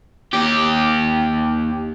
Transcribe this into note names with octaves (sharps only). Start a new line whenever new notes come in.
D#2 G4